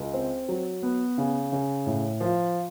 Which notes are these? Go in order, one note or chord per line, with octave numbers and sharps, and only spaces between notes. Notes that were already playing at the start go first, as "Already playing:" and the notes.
Already playing: C#2
C4
F#3
B3
C#3
C#3
A2
F3